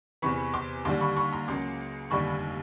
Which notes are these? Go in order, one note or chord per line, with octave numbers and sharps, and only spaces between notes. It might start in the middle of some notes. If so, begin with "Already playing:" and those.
E2 C3 E3 B5 C#6
C6 D6
D#2 D3 G3 C6 D6
B5 C#6
B5 C#6
A#5 C6
C#2 C#3 F#3 A#3 C6 D6
F1 D#2 D3 G3 B5 C#6